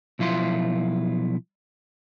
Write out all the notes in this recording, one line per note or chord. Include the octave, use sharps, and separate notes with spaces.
B1 F3 E4 F4 C6